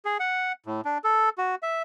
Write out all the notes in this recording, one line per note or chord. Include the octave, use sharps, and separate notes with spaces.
G#4
F#5
A2
D4
A4
F#4
E5